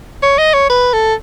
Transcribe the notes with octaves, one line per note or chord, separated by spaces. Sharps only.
C#5
D#5
C#5
B4
A4